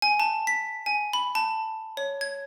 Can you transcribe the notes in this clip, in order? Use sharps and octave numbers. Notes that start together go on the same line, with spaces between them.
G#5
A5
B6
G#5
B5
A5
C#5
G#6